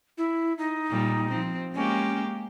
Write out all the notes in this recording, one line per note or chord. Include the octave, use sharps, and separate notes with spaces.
E4
D#4
A#2 G3
F3 C4
G#3 A#3 C#4 G4